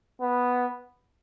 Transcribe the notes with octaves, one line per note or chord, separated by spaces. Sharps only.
B3